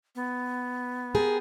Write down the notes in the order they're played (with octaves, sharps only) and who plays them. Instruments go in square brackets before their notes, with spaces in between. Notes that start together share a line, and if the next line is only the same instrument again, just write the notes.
[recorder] B3
[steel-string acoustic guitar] G4 G#4 A#4